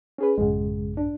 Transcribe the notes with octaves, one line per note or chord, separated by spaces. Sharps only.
C#4 G#4 B4
A1 F#2 C#3 G#3
D4